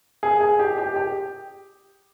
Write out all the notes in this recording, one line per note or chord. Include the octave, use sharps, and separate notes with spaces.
G#4
G#4
G4
G4
G4